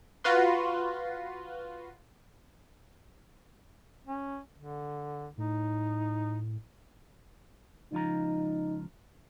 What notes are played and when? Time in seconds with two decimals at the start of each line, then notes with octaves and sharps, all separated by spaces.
0.24 F4 F#4 B4 C6
4.07 C#4
4.58 D3
5.38 A2 D#4
7.92 C#2 F3 D#4 A#5